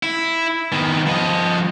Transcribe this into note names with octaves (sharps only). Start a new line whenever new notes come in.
E4
D#3 B3
F3 D#5